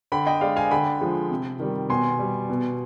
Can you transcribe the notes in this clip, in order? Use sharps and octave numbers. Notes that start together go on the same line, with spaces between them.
D3 G5 B5
D#5 G5
G#3 D5 F5
F5 G#5
D3 G5 B5
F3 G#3
C3
D#3 G3
B2 G#5 C6
G3
B2